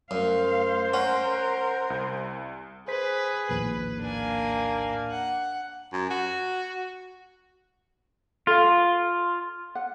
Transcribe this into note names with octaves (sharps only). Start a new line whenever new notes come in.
F#2 A3 C5 F5
C#4 A#4 F#5
C2
G#4 B4 C5 B6
A#1 D#2 A2 B4
A#3 D4 G#5
F#5
F#2
F#4
F4 A4 F5
F#5